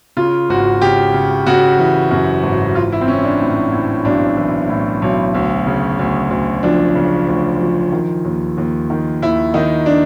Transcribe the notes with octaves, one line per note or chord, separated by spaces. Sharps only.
C#3 F4
G#1 F#4
C#3 G4
C#3
C#3 F#4
E3
F#2
G#1
E3 F4
E4
C4
E3 C#4
D4
A2
A2
B1 D4
E3
A2
B1
D2
C#3
D2
D2
F3 D4
C#3
D2
F3
D#3
D#2
D#2
D#3
D#2 E4
D#3 D#4
D4